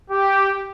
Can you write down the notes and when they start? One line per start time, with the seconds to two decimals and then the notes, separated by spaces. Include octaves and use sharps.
0.11 G4